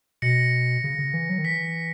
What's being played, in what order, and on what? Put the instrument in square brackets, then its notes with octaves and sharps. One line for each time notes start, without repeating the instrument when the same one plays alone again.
[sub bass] B2 [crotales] A#6 C#7
[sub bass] C#3
C#3
E3
F#3
D#3
[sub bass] E3 [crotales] B6